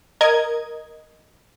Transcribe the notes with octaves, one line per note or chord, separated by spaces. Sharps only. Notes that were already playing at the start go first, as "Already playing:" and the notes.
A#4 D#5 G#6